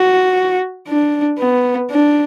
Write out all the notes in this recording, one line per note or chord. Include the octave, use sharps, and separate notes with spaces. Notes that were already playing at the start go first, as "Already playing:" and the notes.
Already playing: F#4
D4
B3
D4